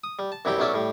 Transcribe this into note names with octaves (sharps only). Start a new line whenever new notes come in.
D#6
G3
A5
F#2 C3 G3 E4 G4 G5
B1 F#3 C#4 D5 E5 D6
A2 G3